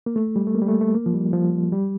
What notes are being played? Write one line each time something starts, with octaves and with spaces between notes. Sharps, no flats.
A#3
A3
G3
A3
A#3
G3
A3
A3
A#3
F3
G3
F3
G3